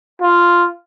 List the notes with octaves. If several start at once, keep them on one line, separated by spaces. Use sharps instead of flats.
F4